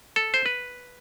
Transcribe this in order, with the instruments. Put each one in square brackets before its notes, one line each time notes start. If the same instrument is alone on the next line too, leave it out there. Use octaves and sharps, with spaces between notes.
[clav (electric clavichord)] A4
C5
B4